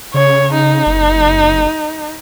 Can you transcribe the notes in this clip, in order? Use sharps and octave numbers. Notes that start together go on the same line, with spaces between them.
C#3 C#5
D#4
F#1